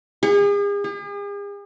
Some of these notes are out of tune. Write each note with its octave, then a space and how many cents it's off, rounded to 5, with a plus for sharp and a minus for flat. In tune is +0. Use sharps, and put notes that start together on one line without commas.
G#4 -40
G#4 -45